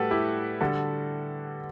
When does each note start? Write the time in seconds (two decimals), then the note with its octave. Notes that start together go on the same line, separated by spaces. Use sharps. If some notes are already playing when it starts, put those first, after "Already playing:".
Already playing: A2 G3 F#4 G4 A4 B4
0.11 E4 G4
0.61 D3 G3 F#4 A4